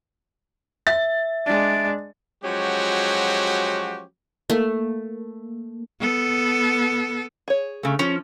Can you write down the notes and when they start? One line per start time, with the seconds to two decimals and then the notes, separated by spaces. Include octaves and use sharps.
0.87 E5 A6
1.46 G#3 D4 D5
2.43 F3 F#3 G#3 C#4 F#4 G4
4.50 A3 A#3
6.00 B3 A4
7.48 G#4 C#5
7.83 C#3 A3
7.99 F3 C#4